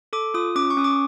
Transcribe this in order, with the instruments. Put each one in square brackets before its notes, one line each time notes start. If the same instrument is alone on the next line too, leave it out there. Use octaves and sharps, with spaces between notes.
[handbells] A4 D6
F4 D#6
C#4 D6
C#6
C#4 D#6
D6